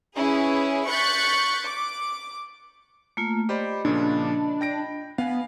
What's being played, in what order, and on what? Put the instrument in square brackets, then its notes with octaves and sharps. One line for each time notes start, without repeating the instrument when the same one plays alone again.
[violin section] C#4 E4 G#4 B4
C#6 F#6 G6 A6 B6 C#7
D6
[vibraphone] A3 A#3 F4
[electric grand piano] G4 C5 D5 [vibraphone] D#5 B5
[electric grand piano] A#2 C#3 F3 [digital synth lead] D4
[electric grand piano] G5 A#6 D7
[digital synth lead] B3 [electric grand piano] F5 G#5